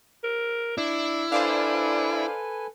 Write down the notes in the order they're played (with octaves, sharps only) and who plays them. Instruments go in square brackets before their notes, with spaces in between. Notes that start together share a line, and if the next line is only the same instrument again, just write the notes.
[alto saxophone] A#4
[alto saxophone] D4 [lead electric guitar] E4
[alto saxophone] D4 [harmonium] A4 B4 G#5 [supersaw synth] C5 D5 F5